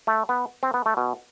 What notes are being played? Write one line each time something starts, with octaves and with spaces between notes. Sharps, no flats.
A3
B3
C4
B3
A3
B2